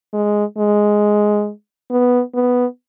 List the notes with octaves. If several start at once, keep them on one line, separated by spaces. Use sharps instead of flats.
G#3
G#3
B3
B3